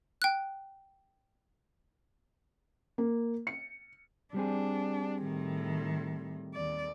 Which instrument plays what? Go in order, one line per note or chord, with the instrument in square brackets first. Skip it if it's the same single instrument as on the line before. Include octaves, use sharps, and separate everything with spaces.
[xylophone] G5 F#6
[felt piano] A#3
C#7
[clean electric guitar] G3 C4 G#4 [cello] D4
[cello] A2 D#3
D#2 D5